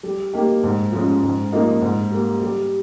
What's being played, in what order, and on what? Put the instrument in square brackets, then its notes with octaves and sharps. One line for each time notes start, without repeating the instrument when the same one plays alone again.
[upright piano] G3
A#3 D#4 G4
G#2
F3 G#3 C#4
G#2
F3 A#3 D#4
G#2
G3 A#3
G3